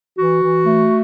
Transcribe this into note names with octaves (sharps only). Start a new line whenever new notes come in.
E3 F#4
E3
A3